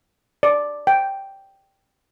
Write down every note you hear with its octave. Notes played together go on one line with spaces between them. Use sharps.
D5
G5